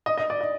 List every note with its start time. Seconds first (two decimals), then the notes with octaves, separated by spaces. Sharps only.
0.06 D#5
0.18 D#5
0.30 D5
0.41 D#5